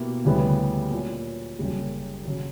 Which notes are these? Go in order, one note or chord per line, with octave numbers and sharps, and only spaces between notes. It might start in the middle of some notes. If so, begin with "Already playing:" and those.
Already playing: B2 A#3 E4 G4
D2 C#3 G3 B3 E4
A#2 F#3 C#4
F#1 F#2 C#3 G3 A#3
C#3 F#3